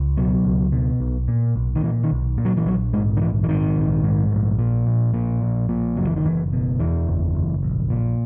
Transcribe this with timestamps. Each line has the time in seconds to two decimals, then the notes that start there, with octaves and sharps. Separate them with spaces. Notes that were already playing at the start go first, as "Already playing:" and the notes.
Already playing: C#2
0.17 B2 F#3
0.45 C#2
0.72 B2
1.00 B1
1.28 A#2
1.56 B1
1.75 D#3
1.83 A#2 E3
2.04 D#3
2.11 B1
2.38 A#2
2.45 F#3
2.57 E3
2.65 A#1 F#3
2.93 G#2 G#3
3.17 D#3
3.21 A#1 E3
3.43 E3
3.48 G#2 D#3
3.76 A#1
4.03 G#2
4.31 A#1
4.59 A#2
4.87 A#1
5.14 A#2
5.42 A#1
5.69 A#2
5.96 F#1 F#3
6.07 E3
6.16 D#3
6.24 F#1 E3
6.53 B2
6.80 E2 E3
7.07 F#1
7.35 F#1
7.63 A#1
7.90 A#2